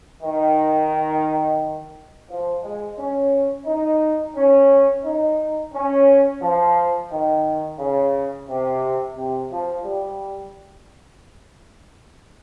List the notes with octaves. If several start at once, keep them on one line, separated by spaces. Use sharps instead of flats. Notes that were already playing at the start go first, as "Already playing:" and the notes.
D#3
F3
G#3
C#4
D#4
C#4
D#4
C#4
F3
D#3
C#3
C3
C3
F3
G3